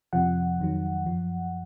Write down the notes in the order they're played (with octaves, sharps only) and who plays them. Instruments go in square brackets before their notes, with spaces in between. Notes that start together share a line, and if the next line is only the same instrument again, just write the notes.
[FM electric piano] F2 C3 F3 F#5
F2 D#3 F#3
F#2 F3